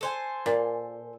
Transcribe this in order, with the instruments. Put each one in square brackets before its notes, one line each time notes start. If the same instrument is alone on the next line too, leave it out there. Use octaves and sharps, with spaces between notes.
[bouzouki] A4 C5 G#5
[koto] A#2